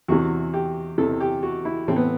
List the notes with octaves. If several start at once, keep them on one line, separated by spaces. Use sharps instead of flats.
E2 C3 E3 F#4
G4
E2 C3 E3 A4
G4
F#4
E4
A2 E3 C4
B3